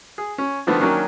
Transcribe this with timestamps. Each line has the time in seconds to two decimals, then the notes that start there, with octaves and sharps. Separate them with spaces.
0.18 G#4
0.38 C#4
0.67 D3 D#3 F3 A3 B3
0.80 D#3 F#3 A#3 C#4 D4